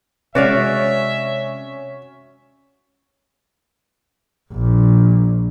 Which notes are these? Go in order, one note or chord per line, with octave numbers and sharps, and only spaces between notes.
C3 G#3 C#4 F#4 D5 E5 F5
A#1